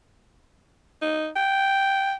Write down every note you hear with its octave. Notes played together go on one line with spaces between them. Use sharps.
D#4
G5